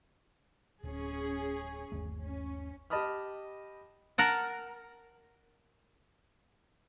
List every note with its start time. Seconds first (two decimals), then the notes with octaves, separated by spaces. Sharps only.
0.84 D1 C#4 G#4
1.92 G1 D#2 A3
2.24 C#4
2.90 G4 D#5 A5 B5 D#6 F6
4.18 A#4 F#5 A5